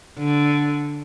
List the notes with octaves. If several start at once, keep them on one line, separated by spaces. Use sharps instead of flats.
D3